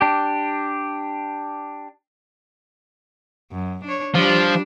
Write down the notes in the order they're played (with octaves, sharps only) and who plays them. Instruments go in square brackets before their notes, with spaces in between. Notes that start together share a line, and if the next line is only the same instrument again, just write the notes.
[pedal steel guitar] D4 G4
[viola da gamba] F#2
D4 C#5
[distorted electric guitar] F3 [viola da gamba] G3 D4